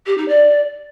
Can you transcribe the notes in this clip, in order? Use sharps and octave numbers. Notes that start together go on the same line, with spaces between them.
G4
D#4
D5